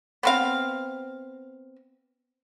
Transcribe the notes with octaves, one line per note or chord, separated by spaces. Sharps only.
B3 C4 F5